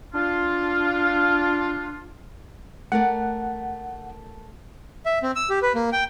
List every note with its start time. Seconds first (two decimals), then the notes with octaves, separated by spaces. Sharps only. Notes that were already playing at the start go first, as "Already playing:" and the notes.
0.14 D4 F4
2.92 A3 A#4 D5 F#5
5.06 E5
5.23 C4
5.36 E6
5.50 G4
5.62 B4
5.75 A#3
5.93 G5